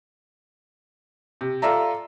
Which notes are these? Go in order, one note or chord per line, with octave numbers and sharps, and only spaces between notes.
C3
F4 A4 D5 E5 A#5